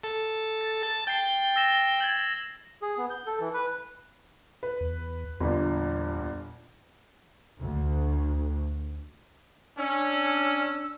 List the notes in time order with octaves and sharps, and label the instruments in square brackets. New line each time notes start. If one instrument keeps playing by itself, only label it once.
[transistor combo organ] A4
[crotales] A6
[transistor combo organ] A5 [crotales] A6
[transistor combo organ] G5 [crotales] A6 C7 G7
[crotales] E6 A#6 E7
G#6 A6 F#7
[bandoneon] G#4
B3
G6
A4
E3
B4
[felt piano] B4
[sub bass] E2
[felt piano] G1 G2 A#2 [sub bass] E2
[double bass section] D2
[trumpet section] C#4 [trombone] D4 [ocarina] E6